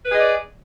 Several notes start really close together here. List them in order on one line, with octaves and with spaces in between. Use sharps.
B4 G#4 D#5 D5